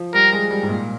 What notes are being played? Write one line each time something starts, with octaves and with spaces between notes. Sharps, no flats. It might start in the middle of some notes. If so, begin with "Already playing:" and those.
Already playing: F3
G3 A#4
G#3
G3
G#2
A#2